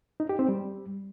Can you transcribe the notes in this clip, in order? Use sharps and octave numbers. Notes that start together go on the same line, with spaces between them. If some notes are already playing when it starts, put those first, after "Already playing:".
D#4
G4
C4
G3